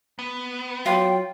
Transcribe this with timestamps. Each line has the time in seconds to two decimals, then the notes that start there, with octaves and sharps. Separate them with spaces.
0.19 B3
0.86 F#3 F4 G5